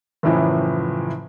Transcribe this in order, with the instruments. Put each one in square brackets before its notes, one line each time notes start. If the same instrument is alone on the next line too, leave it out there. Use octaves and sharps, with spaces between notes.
[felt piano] F#1 A2 E3 F3